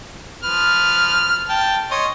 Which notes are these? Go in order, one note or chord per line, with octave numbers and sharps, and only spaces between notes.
F3 B4 F6
G5 A5
C#5 D#5 C6